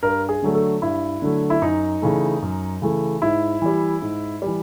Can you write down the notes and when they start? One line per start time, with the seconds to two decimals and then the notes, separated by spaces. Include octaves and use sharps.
0.02 G2 A#4
0.29 G#4
0.42 D3 F#3 A3
0.55 A4
0.82 G2 E4
1.22 D3 F#3 A3
1.50 E4
1.62 F#2 D#4
2.02 C#3 E3 A3
2.42 F#2
2.82 C#3 E3 A3
3.22 G#2 E4
3.62 E3 G3
4.02 G#2
4.42 E3 G3